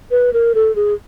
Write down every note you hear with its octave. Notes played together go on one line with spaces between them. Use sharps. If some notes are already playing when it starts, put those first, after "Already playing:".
B4
A#4
A4
G#4